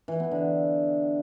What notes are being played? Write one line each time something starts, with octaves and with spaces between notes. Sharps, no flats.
E3
B3
D3